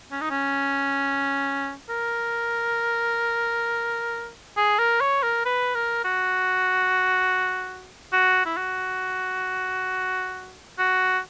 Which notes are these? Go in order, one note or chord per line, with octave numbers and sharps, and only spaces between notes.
C#4
D#4
C#4
A#4
G#4
A#4
C#5
A#4
B4
A#4
F#4
F#4
E4
F#4
F#4